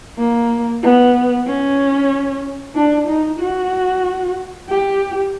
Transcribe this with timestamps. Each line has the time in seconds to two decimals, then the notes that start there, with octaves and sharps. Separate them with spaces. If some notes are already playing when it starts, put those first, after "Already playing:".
0.18 A#3
0.83 B3
1.47 C#4
2.75 D4
3.07 D#4
3.40 F#4
4.69 G4